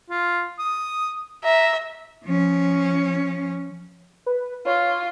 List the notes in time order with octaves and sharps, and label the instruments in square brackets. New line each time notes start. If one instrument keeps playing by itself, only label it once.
[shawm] F4
D#6
[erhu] E5 [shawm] A#5
[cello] F3 C#4
[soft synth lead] B4
[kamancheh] F4 [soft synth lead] C#5